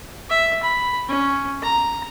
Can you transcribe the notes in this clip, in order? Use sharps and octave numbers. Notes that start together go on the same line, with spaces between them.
E5
B5
C#4
A#5